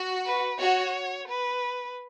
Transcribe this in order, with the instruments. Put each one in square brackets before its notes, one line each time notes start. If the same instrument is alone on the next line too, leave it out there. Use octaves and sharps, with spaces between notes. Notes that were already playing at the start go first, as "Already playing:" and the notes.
Already playing: [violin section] F#4
[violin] B4
[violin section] F#4 [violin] C#5
[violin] B4